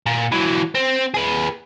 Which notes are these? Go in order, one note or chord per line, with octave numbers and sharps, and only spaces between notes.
A#2
E3 F#3
C4
G#4 B4